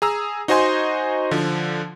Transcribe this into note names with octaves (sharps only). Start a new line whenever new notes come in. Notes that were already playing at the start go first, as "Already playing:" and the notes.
G#4 A#5 E6
D#4 F#4 C5 D#5 G#5 C6
D3 F3